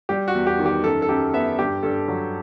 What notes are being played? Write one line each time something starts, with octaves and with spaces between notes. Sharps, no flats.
G3 G4
F#4
E2
G4
D#3
G4
F#2 A4
A4
F#2 G4
B3 E5
G2 G4
G2 A4
F#3